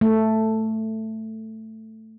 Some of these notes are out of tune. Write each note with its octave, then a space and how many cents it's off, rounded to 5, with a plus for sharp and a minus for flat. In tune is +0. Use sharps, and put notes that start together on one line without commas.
A3 +5